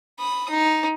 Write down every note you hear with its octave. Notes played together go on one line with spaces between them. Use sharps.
B5 D#6
D#4